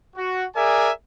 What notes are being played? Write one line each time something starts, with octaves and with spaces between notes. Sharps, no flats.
F#4
G#4 A#4 D5 E5 G#5